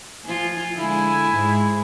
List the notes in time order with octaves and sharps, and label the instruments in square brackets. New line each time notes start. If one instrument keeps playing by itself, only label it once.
[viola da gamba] F3 F4 [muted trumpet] G#5
[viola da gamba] D3 G#3 [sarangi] E4 [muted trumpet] G#5
[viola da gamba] G#2 G#3